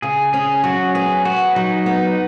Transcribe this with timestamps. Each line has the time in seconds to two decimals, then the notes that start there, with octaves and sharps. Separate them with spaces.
0.02 C#3 G#4
0.33 C#4 G#4
0.64 F#3 F#4
0.95 B3 G#4
1.25 B3 F#4
1.55 F#3 D#4
1.86 B3